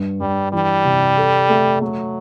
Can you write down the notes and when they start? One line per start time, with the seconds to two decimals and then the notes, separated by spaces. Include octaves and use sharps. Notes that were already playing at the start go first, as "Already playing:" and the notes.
Already playing: G2
0.20 G2 G3
0.52 E3 G3
0.85 C3
1.17 A4
1.49 A3
1.81 F#3 A3